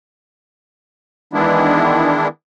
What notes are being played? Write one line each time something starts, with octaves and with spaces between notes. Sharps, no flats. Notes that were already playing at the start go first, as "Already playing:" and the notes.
D#3 E3 G#3 B3 D4 E4